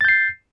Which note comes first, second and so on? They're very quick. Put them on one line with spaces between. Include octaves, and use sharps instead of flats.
A6 G6 C7